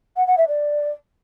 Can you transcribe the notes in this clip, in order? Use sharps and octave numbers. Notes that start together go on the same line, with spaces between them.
F#5
F#5
E5
D5